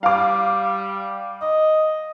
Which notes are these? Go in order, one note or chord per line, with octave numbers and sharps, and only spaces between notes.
G3 F5 D6
D#5